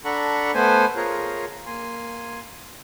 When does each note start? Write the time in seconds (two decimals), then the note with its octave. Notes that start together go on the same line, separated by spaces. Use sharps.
0.05 D4 A4 F#5 A#5 B5 C#6
0.54 A3 B3 C5 G#5
0.96 F4 G#4 A#4 C#5
1.66 A#3 G#5 C6